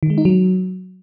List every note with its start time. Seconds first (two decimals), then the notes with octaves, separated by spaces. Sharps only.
0.03 D#3
0.10 G#3
0.18 D#4
0.25 F#3